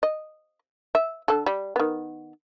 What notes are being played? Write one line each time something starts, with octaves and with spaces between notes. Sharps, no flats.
D#5
E5
D3 A4
G3
D#3 B3